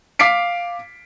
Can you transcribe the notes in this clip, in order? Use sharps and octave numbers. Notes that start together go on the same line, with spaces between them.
F5 D6 B6 C7 D7